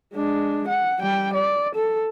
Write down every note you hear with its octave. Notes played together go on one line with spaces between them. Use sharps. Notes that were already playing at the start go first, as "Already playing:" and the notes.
G#3 D4
F#5
G3 G5
D5
A4